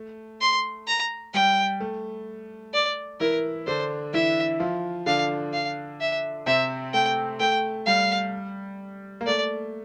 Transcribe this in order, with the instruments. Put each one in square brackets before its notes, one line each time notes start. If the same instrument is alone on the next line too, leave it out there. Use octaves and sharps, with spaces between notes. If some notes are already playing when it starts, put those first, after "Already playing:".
Already playing: [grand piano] A3
[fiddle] C6
A#5
[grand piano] G3 [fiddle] G5
[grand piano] A3
[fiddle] D5
[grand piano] E3 E4 [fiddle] A#4
[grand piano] D3 D4 [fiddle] C5
[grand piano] E3 E4 [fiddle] E5
[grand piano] F3 F4
[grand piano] D3 D4 [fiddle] F5
[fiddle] F5
E5
[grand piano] C3 C4 [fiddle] E5
[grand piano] A3 [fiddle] G5
[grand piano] A3 [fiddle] G5
[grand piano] G3 [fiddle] F5
[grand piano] A#3
[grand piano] A3 [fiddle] D5